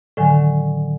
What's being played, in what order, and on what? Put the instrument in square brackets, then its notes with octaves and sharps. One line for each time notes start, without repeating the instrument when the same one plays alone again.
[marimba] A2 D3 D#3 F#3 G#5